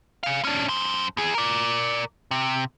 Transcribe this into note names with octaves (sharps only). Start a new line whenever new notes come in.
G#4 F5
C#4 D4
F#2 C5
E2 G#4
A#4 D5
C3